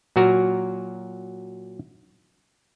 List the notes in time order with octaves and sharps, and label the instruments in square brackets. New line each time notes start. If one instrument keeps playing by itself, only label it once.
[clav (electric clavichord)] A#2 F#3 F#4 A#4